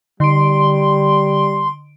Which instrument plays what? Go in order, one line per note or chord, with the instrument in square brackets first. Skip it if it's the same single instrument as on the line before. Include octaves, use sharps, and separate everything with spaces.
[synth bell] D3 D7 [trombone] G3 [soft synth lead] C6